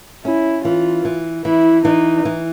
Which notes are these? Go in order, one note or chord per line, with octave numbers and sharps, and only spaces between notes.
C#4 E4
E3 F4
E3
E3 E4
E3 D#4
E3